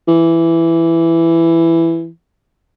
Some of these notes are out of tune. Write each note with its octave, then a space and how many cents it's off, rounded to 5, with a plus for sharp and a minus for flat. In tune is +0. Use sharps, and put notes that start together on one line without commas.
E3 +10